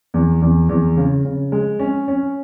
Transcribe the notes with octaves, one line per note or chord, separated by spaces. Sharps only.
E2
E2
E2
C#3
C#3
G#3
C#4
C#4